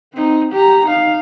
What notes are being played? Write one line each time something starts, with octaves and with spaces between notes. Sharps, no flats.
C4 D#4
G4 A#5
D#4 F5